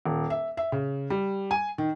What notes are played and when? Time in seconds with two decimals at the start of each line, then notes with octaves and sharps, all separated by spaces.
0.06 D#1
0.30 E5
0.57 E5
0.72 C#3
1.10 G3
1.51 G#5
1.78 D#3